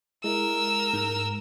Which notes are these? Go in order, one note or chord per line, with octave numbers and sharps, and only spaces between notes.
G#3 E4 A#4 E6
G#2